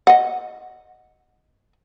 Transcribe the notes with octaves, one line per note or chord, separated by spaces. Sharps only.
D#5 F#5